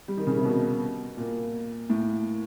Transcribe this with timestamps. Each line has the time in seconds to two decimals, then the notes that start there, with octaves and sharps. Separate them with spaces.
0.08 G3
0.17 D#3
0.27 C#3
0.35 C3
0.45 B2
1.17 A#2
1.90 A2